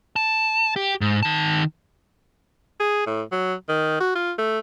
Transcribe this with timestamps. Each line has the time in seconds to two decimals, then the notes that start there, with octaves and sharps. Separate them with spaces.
0.16 A5
0.76 G4
1.01 G#2
1.23 D#3 A5
2.80 G#4
3.07 A2
3.32 F#3
3.69 D#3
4.00 F#4
4.15 F4
4.38 A3